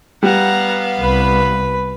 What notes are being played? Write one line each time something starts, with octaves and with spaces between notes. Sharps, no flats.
G3 B3 F5 F#5 A#5
C2 B4 B5